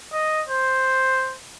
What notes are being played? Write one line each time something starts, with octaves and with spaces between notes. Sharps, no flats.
D#5
C5